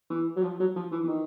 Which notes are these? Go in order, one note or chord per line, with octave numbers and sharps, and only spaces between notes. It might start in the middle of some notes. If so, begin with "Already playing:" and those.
E3
F#3
F3
F#3
F3
E3
E3
D#3